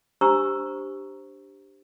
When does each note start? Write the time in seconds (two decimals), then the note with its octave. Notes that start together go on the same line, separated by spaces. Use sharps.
0.21 D4 G4 C5 A#5 C#6 E6